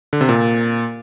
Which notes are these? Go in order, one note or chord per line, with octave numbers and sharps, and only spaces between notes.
D3
C3
A#2